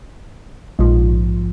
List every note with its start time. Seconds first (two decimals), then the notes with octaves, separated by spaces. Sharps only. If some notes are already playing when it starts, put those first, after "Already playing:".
0.79 A#1 G#2 F3